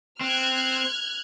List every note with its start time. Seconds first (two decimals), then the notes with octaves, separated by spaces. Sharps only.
0.21 C4 F6 F#6 G#6